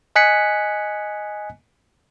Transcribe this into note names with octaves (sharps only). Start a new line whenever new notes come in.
D#5 G#5 F#6 B6 C#7